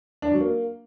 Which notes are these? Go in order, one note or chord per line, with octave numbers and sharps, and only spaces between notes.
D4
F#3
A#3